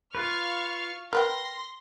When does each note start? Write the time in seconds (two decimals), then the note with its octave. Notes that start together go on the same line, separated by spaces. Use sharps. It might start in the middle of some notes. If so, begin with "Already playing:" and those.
0.15 F4 B4 F5 C#6 F6
1.13 A#4 B4 G5 C6 F6 A#6